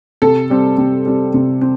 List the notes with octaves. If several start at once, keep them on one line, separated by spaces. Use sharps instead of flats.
C3 A4
G3 C4
C3
G3 C4
C3
C4